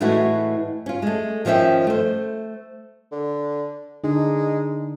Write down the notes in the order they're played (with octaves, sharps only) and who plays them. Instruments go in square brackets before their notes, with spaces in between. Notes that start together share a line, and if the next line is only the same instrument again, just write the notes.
[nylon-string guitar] A2 E3 G#3 A3 E4 F#4
C#4 F4
G#3 A3
D#3 F3 B3 C#4 E5 G5
A3 C5
[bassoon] D3
[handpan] D3 D4 D#4 [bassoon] G#3